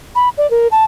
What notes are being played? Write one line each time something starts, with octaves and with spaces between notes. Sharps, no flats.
B5
D5
A#4
A5